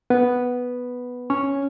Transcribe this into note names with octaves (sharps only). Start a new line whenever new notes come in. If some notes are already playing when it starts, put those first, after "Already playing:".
B3 B4
C#4 C#5